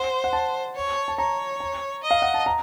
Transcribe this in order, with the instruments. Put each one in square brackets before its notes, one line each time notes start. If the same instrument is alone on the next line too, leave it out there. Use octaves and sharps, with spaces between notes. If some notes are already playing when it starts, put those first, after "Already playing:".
Already playing: [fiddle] C5 [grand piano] F#5
[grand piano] F#5
A5
[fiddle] C#5
[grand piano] A5
[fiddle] C#5 [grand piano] A#5
[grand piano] A#5
[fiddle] D#5
[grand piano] F5
F#5
A5
A#5